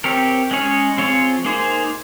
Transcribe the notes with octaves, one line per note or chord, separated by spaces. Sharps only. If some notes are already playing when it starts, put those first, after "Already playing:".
C4 G4 A#4 C#5
G#3 C#4 G#4 C#5
F3 C4 F4 G#4 C#5
A#3 D#4 G#4 C5